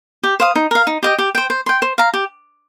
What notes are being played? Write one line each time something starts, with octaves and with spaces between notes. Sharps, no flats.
G4
C5 F5 D#6
D#4
A#4 F5
D#4
G4 D#5 G5
G4
C5 G5
C5
G5 C6
C5
F5 A#5
G4